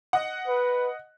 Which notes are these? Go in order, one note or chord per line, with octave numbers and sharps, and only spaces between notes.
D#5 F#5
B4